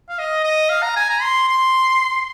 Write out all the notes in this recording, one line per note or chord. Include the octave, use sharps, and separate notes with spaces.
F5
D#5
D#5
F5
A#5
G#5
A#5
C6
C6